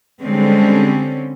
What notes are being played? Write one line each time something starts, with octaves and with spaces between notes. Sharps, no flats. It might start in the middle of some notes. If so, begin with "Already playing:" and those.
D3 G3 G#3 C4 C#4